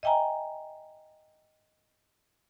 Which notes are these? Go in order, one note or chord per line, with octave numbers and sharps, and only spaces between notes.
D#5 E5 G5 G#5 A#5